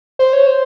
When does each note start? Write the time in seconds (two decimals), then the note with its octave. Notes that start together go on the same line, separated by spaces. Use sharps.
0.19 C5
0.33 C#5
0.46 C5